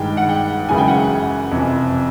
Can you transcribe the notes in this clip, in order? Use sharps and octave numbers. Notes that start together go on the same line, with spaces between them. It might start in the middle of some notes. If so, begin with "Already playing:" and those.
Already playing: G2 D#3 G#3 G5
F#5
G5
F#2 C#3 E3 G#3 G#5
G5
F#5
G5
F2 C3 E3